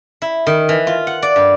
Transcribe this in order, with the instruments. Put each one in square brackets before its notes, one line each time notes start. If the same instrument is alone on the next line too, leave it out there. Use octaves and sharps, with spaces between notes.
[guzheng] E4
D#3
E3
F4
F#5
D5
G2